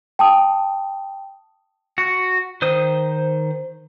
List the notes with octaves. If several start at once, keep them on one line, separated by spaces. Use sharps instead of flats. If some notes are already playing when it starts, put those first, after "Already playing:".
G5 A5 D#6
F#4
D#3 C5 D#6